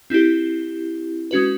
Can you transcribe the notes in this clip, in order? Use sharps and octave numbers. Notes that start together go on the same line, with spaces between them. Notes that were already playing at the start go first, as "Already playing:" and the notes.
C4 E4 G4
G#3 C#4 F#4 B4